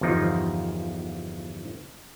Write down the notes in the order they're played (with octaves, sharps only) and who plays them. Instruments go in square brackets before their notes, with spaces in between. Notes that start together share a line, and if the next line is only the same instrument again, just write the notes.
[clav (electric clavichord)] G1 E2 F3 D#4